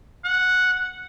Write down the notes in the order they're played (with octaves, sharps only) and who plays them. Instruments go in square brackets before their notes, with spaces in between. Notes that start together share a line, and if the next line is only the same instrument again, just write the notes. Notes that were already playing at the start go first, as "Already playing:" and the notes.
[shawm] F#5